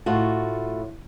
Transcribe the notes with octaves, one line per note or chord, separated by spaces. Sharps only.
A2 F4 F#4